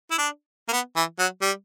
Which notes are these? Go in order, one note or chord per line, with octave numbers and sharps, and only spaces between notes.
E4
D4
A#3
B3
E3
F#3
G3